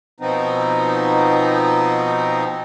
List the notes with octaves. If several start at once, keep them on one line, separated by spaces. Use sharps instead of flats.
B2 F3 B3 C4 D#4